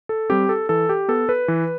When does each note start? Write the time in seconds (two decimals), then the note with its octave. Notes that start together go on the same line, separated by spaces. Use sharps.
0.09 A4
0.29 G3 C4 G4
0.49 A4
0.69 E3 A4
0.89 G4
1.08 B3 A4
1.29 B4
1.48 E3